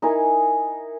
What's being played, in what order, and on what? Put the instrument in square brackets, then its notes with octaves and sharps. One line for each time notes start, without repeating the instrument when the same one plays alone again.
[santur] D#4 E4 A#4 G#5